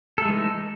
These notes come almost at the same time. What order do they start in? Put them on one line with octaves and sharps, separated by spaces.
A4 A3 G#3 E3 D#4